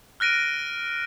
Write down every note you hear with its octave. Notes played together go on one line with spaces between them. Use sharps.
F6 F#6 A#6 D7 D#7